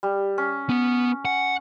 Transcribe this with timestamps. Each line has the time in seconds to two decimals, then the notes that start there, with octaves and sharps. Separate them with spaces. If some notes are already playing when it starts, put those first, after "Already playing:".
0.03 G3
0.38 C#4
0.70 B3
1.25 F#5 G#5